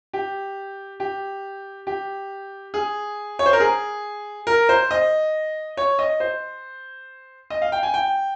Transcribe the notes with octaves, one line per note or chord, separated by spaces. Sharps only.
G4
G4
G4
G#4
C#5
C5
A#4
G#4
A#4
C5
D#5
C#5
D#5
C5
D#5
F5
G5
G#5
G5